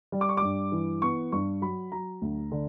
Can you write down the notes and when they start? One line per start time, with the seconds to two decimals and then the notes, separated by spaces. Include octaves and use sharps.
0.12 G3
0.21 D6
0.29 C#6
0.37 G2 D6
0.72 E3
1.02 B3 C#6
1.32 G2 C#6
1.62 F#3 B5
1.92 F#3 A#5
2.22 D2
2.52 D3